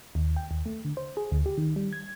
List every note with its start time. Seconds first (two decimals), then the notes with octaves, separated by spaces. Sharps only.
0.15 D#2
0.36 G5
0.51 D#2
0.66 A3
0.85 D3
0.97 C5
1.17 G#4
1.31 D2
1.46 G4
1.58 D#3
1.76 G3
1.93 G#6